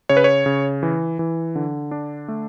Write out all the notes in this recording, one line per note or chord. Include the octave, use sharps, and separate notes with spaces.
C#3 C#5
B4
C#5
C#3
E3
E3
D3
D4
A3